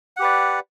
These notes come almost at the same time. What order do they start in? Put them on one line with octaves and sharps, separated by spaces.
F#5 G4 B4 D5